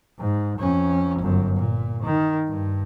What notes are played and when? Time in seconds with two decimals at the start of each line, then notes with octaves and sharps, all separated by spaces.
0.19 G#2
0.59 F2 C#4
1.20 G1 F#2
1.57 A#2
2.03 D#3
2.47 G2